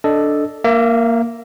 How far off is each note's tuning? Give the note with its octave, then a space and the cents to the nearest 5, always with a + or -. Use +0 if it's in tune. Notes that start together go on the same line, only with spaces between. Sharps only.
D4 +0 A4 +0 D#5 +0
A#3 +0 E5 +35